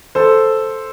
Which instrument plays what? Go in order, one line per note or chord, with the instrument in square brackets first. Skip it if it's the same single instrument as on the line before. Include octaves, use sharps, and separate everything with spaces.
[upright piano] A4 C5